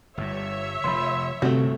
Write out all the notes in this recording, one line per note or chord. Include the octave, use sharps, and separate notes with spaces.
G1 G2 C#5 E5
F1 F3 B5 C6
G1 C3 A3 C4 F#4